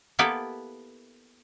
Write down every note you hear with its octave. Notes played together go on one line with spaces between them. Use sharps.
A#3 B3 E4 G4 A4 B4